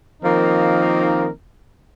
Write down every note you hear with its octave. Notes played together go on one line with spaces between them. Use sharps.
D#3 F3 A#3 C4 D#4 A#4